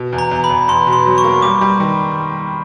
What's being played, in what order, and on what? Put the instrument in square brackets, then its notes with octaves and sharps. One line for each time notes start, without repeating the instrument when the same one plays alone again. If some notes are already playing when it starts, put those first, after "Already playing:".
Already playing: [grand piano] B2
E2
[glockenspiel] A#5
[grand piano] E2
[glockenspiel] B5
[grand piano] E2
[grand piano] E2 [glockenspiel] C6
[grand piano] B2
[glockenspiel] C6
[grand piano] F#3
[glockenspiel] C#6
[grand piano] A#3
[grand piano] G3 [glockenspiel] D6
[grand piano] G3
D#3